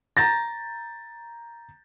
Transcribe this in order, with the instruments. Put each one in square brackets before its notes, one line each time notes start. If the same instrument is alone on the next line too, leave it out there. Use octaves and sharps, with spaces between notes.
[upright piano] A#5 G6 A6 A#6